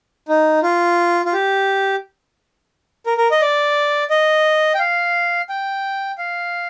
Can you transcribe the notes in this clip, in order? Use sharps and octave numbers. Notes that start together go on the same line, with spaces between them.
D#4
F4
F4
G4
A#4
A#4
D#5
D5
D#5
G5
F5
G5
F5